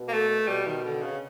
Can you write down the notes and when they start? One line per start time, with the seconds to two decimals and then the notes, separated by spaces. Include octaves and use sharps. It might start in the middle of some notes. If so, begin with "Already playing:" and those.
Already playing: B2
0.08 A#3
0.13 A3
0.48 B2 G3
0.66 D#3
0.83 D3
1.02 C#3